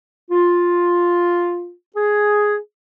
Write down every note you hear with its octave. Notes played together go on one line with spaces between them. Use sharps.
F4
G#4